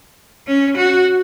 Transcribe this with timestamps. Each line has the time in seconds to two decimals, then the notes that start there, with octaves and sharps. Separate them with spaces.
0.47 C#4
0.77 F#4